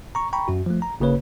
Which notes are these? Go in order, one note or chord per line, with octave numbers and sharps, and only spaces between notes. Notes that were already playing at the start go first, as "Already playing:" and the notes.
A#5 C#6
G5 A#5 B5 C#6
F#2 F#4
F3 A3
A#5
G1 C#3 A#3 B4 C#5